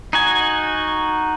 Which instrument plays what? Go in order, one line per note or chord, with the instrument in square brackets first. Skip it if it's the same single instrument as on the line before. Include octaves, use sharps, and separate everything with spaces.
[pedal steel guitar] D#4 F#4 G#5